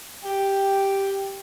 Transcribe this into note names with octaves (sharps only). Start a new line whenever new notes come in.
G4 G5